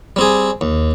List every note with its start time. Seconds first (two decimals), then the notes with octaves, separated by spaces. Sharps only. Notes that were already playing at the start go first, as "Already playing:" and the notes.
0.16 G3 C4 G#4
0.61 D#2